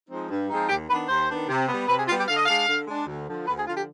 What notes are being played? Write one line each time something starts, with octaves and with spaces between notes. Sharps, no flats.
F3 G#3 C4 D#4
G2
F3 G#3 C4 D#4
D#2 G4
D#3 B3 D4 B4
D#2 C5
D#3 B3 D4
C3
G3 B3
C3 B4
G#4
G3 B3 F4
G4
D3 F5
D#5
G#3 D4 F5
D3
G#3 D4
D2
D3 F3
D2 B4
G#4
D3 F3 F4
G4